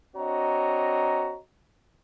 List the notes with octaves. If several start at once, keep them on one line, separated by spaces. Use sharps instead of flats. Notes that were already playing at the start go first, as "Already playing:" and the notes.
C4 D4 F#4 C#5 D#5 A#5